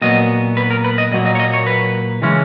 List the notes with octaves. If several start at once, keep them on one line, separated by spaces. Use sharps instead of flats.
A#2 F#3 B3 D#5
B4
A#4
B4
D#5
A#2 F#3 A#3 D#5
D#5
C#5
D#5
C#5
B4
C#3 E3 G#3 C#4